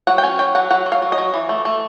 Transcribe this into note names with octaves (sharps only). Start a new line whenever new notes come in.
F#3 F#5
G5
C#4 G#5
F#3 G5
F#3 F#5
F#3 F#5
F#3
F5
F#3
D#5
F#3
E3
A3
A3